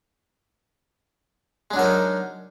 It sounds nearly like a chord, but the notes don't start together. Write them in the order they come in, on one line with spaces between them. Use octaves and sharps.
G#3 D4 F#3 A#4 D#4